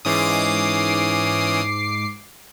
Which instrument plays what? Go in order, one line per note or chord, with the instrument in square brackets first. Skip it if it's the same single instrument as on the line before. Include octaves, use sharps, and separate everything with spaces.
[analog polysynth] G#2 D6 C7 [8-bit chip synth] E3 C#4 D#6